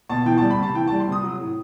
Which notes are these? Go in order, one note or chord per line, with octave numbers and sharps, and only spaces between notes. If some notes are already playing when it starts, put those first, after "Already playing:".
B2 A5
E3 G5
A5
G3
B5
C3 A5
E3 G5
A5
G3
C6
C3
D#6
F#3
A2